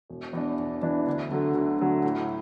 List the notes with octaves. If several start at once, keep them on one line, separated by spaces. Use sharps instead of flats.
E1
E2 E3 D4
E1
E2 E3 D4
D2
D3 F#3 A3
D2
D3 F#3 A3
A2